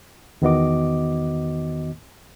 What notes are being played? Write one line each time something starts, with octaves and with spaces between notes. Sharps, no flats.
E2 D#3 B3 F#4 D#5 D6